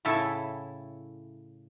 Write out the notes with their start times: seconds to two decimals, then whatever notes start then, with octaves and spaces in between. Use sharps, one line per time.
0.05 A2 C#3 E4 A4 G#5